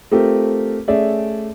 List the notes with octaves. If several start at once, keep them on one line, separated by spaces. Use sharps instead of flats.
A3 C4 F4 G4 A4 A#4
A3 C#4 G#4 D5 E5